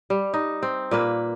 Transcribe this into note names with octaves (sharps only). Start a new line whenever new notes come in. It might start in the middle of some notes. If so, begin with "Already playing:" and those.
G3
D#4
C4
A#2 A#3 B4